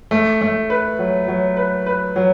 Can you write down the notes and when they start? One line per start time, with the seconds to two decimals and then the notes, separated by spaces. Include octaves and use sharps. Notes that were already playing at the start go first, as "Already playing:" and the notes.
0.11 A3
0.41 A3
0.70 B4
0.99 F#3
1.28 F#3
1.57 B4
1.86 B4
2.16 F#3